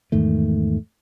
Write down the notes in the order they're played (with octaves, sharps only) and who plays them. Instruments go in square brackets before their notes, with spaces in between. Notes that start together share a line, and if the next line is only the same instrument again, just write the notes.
[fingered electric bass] E2 G#2 D#3 A3